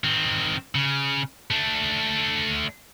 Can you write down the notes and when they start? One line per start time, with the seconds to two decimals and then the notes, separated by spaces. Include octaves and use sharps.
0.04 D#3 C4
0.75 C#3
1.51 A3 D4